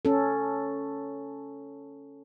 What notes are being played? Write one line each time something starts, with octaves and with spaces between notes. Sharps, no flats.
C#4 A4